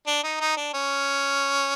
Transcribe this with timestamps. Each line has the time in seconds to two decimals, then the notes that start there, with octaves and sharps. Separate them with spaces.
0.07 D4
0.24 D#4
0.41 D#4
0.57 D4
0.74 C#4